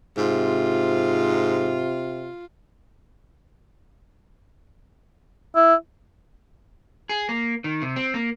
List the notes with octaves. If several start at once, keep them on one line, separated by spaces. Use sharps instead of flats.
G#2 C3 F4
E4
G#4
A#3
D#3
C3
C4
A#3